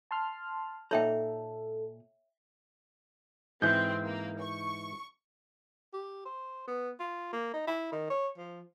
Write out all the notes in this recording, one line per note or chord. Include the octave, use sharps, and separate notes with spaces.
A5 C6 F6
A#2 D#4 A4 C#5 E5 G5 A#5
G#2 E3 C4 G6
A#3
C#6
G4
C5
B3
F4
A#3
D#4
E4
D#3
C#5
F3